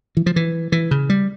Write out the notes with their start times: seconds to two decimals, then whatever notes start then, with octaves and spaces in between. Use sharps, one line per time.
0.17 E3
0.26 F3
0.36 E3
0.72 E3
0.91 C#3
1.10 G3